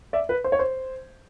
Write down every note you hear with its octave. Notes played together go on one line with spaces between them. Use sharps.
D5 E5
B4
C5
C#5
C5